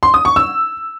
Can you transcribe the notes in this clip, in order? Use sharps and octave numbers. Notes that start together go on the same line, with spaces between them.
C6
D#6
C#6
E6